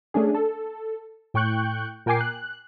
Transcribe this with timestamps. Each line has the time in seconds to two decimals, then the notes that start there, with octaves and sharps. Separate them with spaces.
0.14 A3 C#4 D4 G#4
0.34 A4
1.34 A2 G5 C#6 F#6 G6
2.06 A#2 A#4 G5 G#5 D6 C7
2.21 F#6